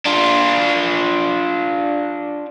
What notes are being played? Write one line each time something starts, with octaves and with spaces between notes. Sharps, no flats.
D4 F4